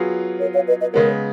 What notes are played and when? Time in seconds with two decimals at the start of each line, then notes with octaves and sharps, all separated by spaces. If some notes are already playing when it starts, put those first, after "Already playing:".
Already playing: F#3 B3 F4 G#4
0.40 A#4 C#5
0.54 C#5 F5
0.67 B4 D#5
0.80 B4 D#5
0.93 C#3 G#3 B3 A#4 C#5